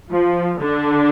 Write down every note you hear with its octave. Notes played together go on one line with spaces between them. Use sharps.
F3
D3 D4